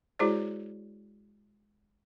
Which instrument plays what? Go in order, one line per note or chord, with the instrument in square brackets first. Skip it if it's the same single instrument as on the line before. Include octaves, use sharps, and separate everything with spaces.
[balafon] G#3 E4 F#4 G#4 C5 D5